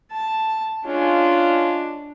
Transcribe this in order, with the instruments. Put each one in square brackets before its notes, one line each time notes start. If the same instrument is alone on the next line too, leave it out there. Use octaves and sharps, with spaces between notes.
[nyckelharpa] A5
[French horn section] G#3 C#4 F4 [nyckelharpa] D4